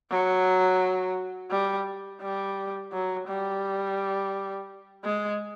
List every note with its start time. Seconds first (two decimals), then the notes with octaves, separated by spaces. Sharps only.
0.10 F#3
1.51 G3
2.21 G3
2.92 F#3
3.28 G3
5.04 G#3